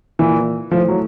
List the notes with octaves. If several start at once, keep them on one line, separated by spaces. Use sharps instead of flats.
A#2 E3
A2 F3
F#3